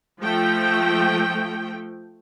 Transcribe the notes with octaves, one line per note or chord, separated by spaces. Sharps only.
F3 A3 G5